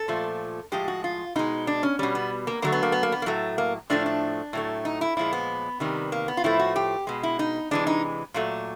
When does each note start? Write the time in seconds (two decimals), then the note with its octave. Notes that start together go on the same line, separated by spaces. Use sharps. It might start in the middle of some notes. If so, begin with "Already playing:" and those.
Already playing: A4
0.08 A#2 F3 A3
0.72 A2 F3 G#3 G4
0.88 F#4
1.04 F4
1.36 B2 G#3 D#4
1.67 D4
1.83 C#4
1.99 B2 G3 C#4
2.15 B3
2.47 A#3
2.62 D3 F#3 A3 A#3
2.72 B3
2.83 A#3
2.92 B3
3.03 A#3
3.12 B3
3.22 A#3
3.26 A2 F#3 A3
3.58 A#3
3.90 A2 F3 A3 D4
4.06 D4
4.53 A2 F#3 A3
4.85 D#4
5.01 E4
5.17 A#2 F3 G#3 E4
5.33 B3
5.80 C3 D#3 G3
6.12 A#3
6.28 B3
6.37 F4
6.44 A2 F3 A3 E4
6.59 F#4
6.76 G4
7.07 B2 G#3
7.23 E4
7.39 D#4
7.71 C3 E3 G#3 D4
7.87 D#4
8.34 A#2 F#3 A3